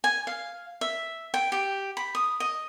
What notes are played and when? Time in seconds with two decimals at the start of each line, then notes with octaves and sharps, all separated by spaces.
0.04 G#5
0.27 F5
0.81 E5
1.34 G5
1.52 G4
1.97 B5
2.15 D#6
2.40 D#5